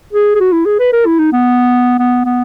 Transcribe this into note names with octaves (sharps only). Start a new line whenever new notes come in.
G#4
G#4
F#4
E4
G#4
B4
A#4
E4
D#4
B3
B3
B3